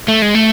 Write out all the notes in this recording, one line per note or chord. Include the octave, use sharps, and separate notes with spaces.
A3
G#3
A3